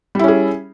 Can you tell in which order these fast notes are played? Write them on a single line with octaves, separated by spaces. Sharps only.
G3 E4 C#4 G#4